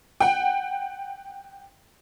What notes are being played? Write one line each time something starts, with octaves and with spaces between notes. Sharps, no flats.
F#5 G5